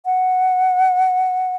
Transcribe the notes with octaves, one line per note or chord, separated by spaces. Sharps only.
F#5